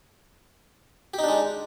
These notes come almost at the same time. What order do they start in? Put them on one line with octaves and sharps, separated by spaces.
G4 D#4 D4 G#3